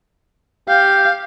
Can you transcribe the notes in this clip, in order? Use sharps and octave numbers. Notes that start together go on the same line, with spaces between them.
G4 F5